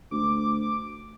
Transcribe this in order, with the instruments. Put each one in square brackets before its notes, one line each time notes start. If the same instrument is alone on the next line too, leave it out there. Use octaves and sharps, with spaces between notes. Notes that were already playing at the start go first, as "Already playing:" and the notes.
[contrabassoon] D2 [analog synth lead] D6